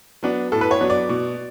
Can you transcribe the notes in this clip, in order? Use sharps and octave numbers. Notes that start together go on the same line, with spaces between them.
F#3 B3 D4
A2 A4
B4
C#5
F#3 B3 D4
D5
B2